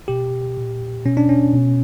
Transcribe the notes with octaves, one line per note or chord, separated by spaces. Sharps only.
B2 G4
A#2
B2 C#4
D4
C#4
B2